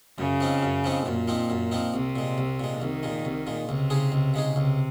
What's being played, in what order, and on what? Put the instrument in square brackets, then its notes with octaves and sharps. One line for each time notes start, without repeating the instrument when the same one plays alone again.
[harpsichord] F#2 [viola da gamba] C#3
[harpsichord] F3 C4 D#4
F#2
F3 C4 D#4
[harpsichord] F#2 [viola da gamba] A#2
[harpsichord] F3 C4 D#4
F#2
F3 C4 D#4
[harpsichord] C2 [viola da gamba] C3
[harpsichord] A#2 G#3
C2
A#2 G#3
[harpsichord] C2 [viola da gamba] D#3
[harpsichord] A#2 G#3
C2
A#2 G#3
[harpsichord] C#2 [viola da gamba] C3
[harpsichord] C#3 G#3 D#4 G#4
C#2
C#3 G#3 D#4 G#4
[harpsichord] C#2 [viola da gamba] C3